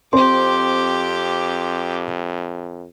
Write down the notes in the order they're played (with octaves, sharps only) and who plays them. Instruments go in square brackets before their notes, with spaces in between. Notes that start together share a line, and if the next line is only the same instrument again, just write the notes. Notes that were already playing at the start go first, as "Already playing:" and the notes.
[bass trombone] F2 [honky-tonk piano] C4 C5 [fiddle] G4 D6 [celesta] C6